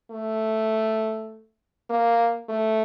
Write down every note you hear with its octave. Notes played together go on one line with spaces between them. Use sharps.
A3
A#3
A3